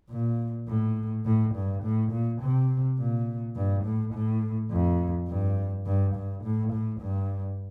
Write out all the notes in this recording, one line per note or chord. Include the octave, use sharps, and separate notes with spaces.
A#2
A2
A2
G2
A2
A#2
C3
A#2
G2
A2
A2
F2
G2
G2
G2
A2
A2
G2